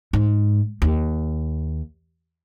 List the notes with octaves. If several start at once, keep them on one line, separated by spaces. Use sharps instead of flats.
G#2
D#2